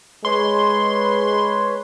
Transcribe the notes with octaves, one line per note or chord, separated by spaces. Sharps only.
G#3 B4 C#5 C6